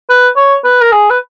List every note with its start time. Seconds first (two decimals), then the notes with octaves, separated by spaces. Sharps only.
0.10 B4
0.36 C#5
0.64 B4
0.82 A#4
0.92 G#4
1.10 B4